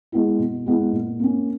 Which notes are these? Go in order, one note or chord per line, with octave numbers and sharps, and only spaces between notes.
G#3 B3 E4
B2
G#3 B3 E4
A#2
A#3 C#4